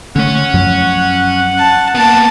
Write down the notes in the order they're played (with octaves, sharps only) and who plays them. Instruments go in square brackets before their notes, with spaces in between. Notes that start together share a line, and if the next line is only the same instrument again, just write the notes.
[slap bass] D3 A3 [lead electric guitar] C#4 C#5 [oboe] F#5
[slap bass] F#2 F3 F#3
[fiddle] A5
[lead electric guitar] A#3 B3 [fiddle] A5